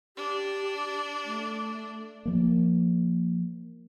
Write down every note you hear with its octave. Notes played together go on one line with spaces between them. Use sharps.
D4 G4
A3
F3 A#3